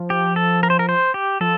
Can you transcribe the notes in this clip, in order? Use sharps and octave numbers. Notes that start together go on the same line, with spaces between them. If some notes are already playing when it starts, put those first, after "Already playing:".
Already playing: F3
G4
A4
A#4
C5
A#4
C5
G4
F3 A4